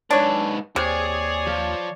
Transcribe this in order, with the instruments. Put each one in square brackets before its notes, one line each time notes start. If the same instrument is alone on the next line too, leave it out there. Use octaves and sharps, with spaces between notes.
[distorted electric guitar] G#2 B4 [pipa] D4 C#5
[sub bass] D#2 [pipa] C3 [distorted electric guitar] G#4 G#5 [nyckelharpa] C#5 D5
[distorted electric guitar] F3